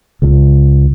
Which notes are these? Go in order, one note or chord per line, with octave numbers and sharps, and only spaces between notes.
C#2